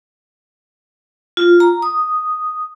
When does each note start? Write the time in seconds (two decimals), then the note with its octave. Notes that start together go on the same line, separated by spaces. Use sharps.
1.37 F4
1.60 A#5
1.82 D#6